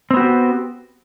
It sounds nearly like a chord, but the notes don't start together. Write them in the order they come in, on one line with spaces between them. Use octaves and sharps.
C4 B3 F#4 G4